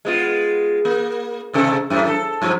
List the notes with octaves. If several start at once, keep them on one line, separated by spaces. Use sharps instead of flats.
G#3 B3 F4
A#3
G#2 C3 A4
F#2 A2
A4
G2 F3 F#3